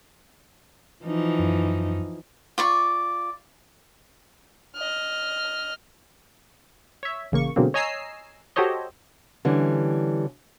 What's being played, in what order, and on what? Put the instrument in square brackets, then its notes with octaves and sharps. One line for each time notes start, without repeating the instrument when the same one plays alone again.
[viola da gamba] E3 F3 D#4
[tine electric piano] F#2
[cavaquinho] F4 D5 C#6
[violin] D#5 F6
[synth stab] C#5 E5
A1 C#3 A#3 C#6
B2 D3 F#3 G#3 A#3 C4
C#5 D#5 G#5 A#5 E6 C7
F#4 G4 A4 C5 C#5 D#5
[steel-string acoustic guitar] D3 E3 G3 C#4